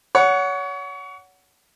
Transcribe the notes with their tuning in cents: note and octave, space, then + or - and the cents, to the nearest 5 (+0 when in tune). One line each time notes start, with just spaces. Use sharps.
C#5 +30 F#5 +0